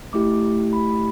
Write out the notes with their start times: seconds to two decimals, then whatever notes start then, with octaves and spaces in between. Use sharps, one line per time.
0.13 A3 E4 G4 D6
0.73 B5